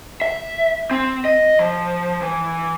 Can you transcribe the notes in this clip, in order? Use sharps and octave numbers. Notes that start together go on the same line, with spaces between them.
E5
C4
D#5
F3
E3